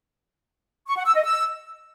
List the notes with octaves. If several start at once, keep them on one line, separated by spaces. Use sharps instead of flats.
C#6
F#5
E6
D#5
E6